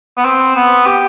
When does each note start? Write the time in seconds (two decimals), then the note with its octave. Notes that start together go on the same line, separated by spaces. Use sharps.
0.17 B3
0.25 C4
0.56 B3
0.86 G4